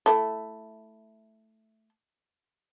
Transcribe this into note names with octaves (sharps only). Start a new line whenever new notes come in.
A3 E4